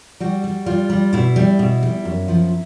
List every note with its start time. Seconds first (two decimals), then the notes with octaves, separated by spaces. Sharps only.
0.20 G3 F#4
0.44 G3
0.66 G3 F4
0.90 G3
1.13 B2 E4
1.36 G3
1.59 B2
1.83 G3
2.05 F#2
2.28 F3